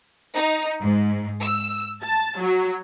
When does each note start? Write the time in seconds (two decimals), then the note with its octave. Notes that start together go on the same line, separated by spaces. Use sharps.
0.35 D#4
0.82 G#2
1.42 E6
2.03 A5
2.39 F#3